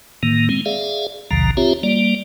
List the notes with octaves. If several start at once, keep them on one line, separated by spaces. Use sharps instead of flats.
A2 D#3 A#3
G#3 C4
G#4 D5 E5 F5
A#1 D#2 B2 D3 F3 A#5
C4 F4 G4 C#5 E5 A#5
G3 A#3 D5